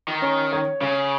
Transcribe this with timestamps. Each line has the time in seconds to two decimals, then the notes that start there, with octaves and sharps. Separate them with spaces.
0.08 D#3
0.22 C#4
0.53 C#5
0.81 C#3 C#4